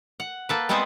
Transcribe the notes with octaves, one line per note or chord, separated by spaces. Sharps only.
F#5
A#3 A4 B4
G3 G#3 B3 C4 B4 C5